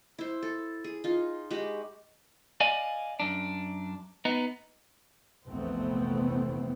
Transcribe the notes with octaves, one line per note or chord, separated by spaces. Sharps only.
E4 C5
A4
G#4
D#4 F4
G#3 F#4 G4 B5
D5 D#5 F5 G#5
F#2 D4
B3 D#4
F1 A#1 E2 A3 B3 C4